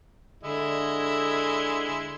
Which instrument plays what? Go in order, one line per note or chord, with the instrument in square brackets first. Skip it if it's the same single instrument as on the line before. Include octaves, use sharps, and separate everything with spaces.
[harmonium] D3 [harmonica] G#3 E4